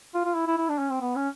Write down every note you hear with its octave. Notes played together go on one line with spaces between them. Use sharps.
F4
F4
E4
E4
E4
D4
C#4
C4
B3
C#4